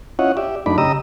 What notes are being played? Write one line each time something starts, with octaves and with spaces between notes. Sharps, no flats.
C#4 E4 F4 C#5 D#5 F#5
G4 D5 E5
F#2 A3 D4 D#4 D5 B5
C#3 G4 D#5 A#5 D#6 E6